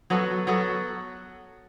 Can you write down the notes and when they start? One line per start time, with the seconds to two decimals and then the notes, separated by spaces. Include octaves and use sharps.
0.10 F#3 B3 F#4 A4
0.47 F#3 B3 F#4 A4